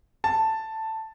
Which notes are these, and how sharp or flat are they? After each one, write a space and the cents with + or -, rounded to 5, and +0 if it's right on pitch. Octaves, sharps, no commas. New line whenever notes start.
A5 +5